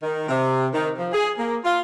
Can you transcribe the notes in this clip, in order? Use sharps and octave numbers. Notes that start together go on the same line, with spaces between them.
D#3
C3
D#3
F3
G#4
A#3
F4